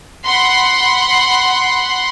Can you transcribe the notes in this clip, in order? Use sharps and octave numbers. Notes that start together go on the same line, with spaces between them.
F#5 B5 C6